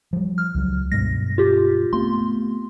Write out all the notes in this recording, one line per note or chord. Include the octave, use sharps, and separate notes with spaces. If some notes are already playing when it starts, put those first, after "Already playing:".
F3 G3
F6
C#2 F#3
G2 B2 G#3 A#6
F4 G4
A3 B3 C4 C6